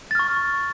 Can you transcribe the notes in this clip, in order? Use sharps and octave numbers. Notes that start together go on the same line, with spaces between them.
C#6 F6 A6